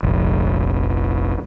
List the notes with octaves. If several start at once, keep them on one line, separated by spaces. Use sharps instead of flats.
F1 A#1